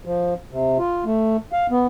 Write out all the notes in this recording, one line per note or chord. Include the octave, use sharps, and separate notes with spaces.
F3
C3
F4
A3
F5
B3